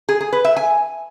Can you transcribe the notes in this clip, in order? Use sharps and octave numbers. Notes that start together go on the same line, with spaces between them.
G#4
G#4
B4
E5
G#5